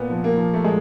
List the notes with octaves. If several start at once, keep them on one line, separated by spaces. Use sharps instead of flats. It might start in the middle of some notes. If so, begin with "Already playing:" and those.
Already playing: A#2 B3
F3
A#3
F3
A3
A#2 G#3